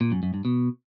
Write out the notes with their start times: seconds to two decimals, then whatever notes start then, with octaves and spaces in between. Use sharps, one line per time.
0.01 A#2
0.12 F#2
0.23 F#2
0.34 G2
0.45 B2